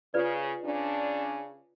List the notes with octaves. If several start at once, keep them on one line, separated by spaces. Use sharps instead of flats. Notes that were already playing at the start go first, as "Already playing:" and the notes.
C#3 F4 B4 D5
C#3 C#4 D4